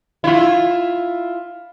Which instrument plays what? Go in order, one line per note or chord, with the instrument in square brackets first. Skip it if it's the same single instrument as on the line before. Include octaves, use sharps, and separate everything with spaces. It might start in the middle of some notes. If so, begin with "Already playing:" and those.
[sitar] E4 F4